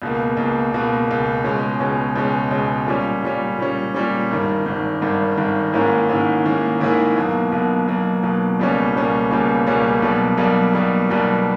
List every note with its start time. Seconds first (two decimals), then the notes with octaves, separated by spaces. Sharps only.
0.02 C#2 B2 A#3
0.37 C#2 B2 A#3
0.73 C#2 B2 A#3
1.08 C#2 B2 A#3
1.44 C#2 B2 G#3 C#4
1.80 C#2 B2 G#3 C#4
2.16 C#2 B2 G#3 C#4
2.51 C#2 B2 G#3 C#4
2.87 A#2 G3 C#4
3.22 A#2 G3 C#4
3.58 A#2 G3 C#4
3.94 A#2 G3 C#4
4.30 G#1 G2 D#3
4.66 G#1 G2 D#3
5.01 G#1 G2 D#3
5.37 G#1 G2 D#3
5.73 G#2 D#3 A#3 C#4 E4
6.09 G#2 D#3 A#3 C#4 E4
6.44 G#2 D#3 A#3 C#4 E4
6.80 G#2 D#3 A#3 C#4 E4
7.16 B1 B2 A#3
7.52 B1 B2 A#3
7.87 B1 B2 A#3
8.23 B1 B2 A#3
8.60 C#2 B2 G3 A#3 C#4
8.94 C#2 B2 G3 A#3 C#4
9.31 C#2 B2 G3 A#3 C#4
9.67 C#2 B2 G3 A#3 C#4
10.02 B1 B2 G3 A#3
10.38 B1 B2 G3 A#3
10.73 B1 B2 G3 A#3
11.09 B1 B2 G3 A#3